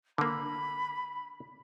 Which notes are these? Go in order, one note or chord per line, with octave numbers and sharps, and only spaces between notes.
D3 A#3 B5